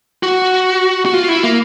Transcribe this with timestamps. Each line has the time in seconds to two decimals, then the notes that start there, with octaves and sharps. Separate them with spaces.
0.23 F#4
1.06 F#4
1.14 F4
1.29 E4
1.43 A#3